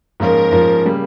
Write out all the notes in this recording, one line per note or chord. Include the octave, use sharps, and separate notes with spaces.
G#2 F3 A#3 C#4 F4 A#4
G#2 F3 A#3 C#4 F4
C#3 G3 A#3